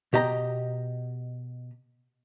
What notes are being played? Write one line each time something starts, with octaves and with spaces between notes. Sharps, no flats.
B2 G4 D#5 A#5